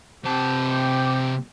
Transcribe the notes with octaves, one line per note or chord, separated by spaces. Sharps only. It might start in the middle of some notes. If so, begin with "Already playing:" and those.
C3 C4 G4 A5